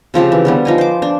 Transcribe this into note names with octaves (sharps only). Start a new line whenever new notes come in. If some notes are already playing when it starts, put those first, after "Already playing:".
C#3 F3 C4 G4
E3
D3 G3 B3
F3 D#4 G#5
C5 D6
D4